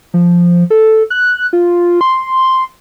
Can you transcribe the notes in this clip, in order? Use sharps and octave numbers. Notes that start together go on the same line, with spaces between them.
F3
A4
F#6
F4
C6